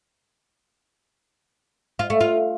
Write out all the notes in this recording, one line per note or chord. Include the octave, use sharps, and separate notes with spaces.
F4
A3
F4